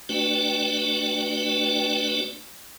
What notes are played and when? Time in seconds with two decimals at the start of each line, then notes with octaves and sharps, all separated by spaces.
0.09 A3 D4 F#4 B4 D5 G5